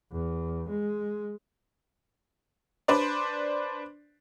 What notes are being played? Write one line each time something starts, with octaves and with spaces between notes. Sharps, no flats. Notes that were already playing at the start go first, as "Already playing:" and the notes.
E2
G#3
D4 B4 C5 D5